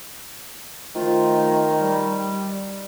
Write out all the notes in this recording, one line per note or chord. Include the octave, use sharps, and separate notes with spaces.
D#3 F3 A3 F4
G3